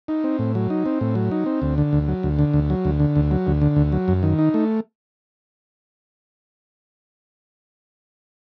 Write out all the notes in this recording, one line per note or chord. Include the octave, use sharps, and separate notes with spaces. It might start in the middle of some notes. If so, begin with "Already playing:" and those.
D#4
C4
A2
F#3
D#4
C4
A2
F#3
D#4
C4
D2
D3
D2
F#3
D2
D3
D2
F#3
D2
D3
D2
F#3
D2
D3
D2
F#3
F#2
D#3
D#4
A3